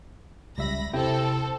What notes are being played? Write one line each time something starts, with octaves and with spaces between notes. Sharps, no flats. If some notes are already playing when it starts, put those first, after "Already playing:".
C#2 G3 E5 B5 A#6
C3 C4 E4 A4 G5